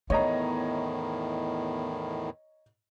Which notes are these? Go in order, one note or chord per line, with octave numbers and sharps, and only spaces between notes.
E2 A2 D#3 B3 C#5 D#5 A#5